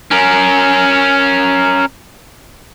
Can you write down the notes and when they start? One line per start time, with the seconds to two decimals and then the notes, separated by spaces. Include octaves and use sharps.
0.11 C#4 A#4